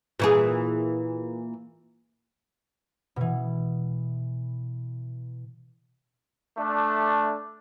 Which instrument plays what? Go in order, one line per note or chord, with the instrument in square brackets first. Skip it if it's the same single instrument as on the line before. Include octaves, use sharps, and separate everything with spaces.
[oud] A#2 E3 G#4
[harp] B2 E3
[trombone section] A3 D4